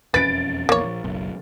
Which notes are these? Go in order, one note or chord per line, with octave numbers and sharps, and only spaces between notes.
E1 F2 C#4 B4 A6 D7
A#1 E2 A#3 C#5
A#1
F#1 B1